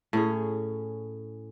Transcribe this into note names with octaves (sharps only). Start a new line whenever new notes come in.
A2 C#4 G#4